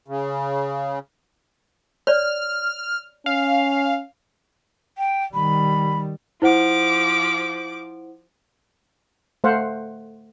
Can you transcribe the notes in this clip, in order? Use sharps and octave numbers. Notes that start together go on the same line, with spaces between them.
C#3
C#5 D5 F6
C#4 F5
G5
D#3 G3 B5
F3 E4 C5 F#5 D6
A3 C5 F5 F#5